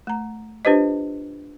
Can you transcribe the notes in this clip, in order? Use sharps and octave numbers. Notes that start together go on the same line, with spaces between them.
A3 A#5
D4 F4 G4 B4 C5 D#5